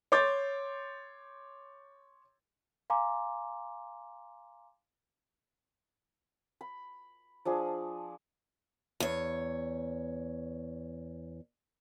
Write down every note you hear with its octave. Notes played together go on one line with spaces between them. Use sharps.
C#5 C6 D6 G6 A6
F5 G#5 A#5 C6 D6
B5
F3 D4 G#4
E2 C#5